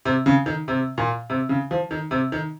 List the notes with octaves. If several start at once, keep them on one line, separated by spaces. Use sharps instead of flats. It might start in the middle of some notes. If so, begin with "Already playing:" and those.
C3
C#3
D#3
C3
A#2
C3
C#3
F3
D#3
C3
D#3